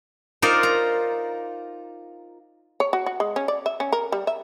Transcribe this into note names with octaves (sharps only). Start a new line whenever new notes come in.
D#4 F4 A#4 C5 D5
A#5
C#5
F#4
F#4
G#3
C#4
D5
E5
C#4
A#4
G3
E5